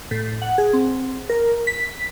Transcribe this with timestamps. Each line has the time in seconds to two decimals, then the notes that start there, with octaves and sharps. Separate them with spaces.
0.11 A2
0.42 F#5
0.58 G#4
0.73 C4
1.30 A#4
1.67 B6